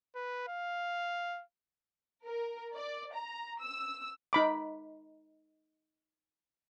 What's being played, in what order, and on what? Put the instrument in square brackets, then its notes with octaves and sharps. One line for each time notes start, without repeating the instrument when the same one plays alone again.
[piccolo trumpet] B4
F5
[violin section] A#4
D5
A#5
E6
[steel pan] D#4 B5 D6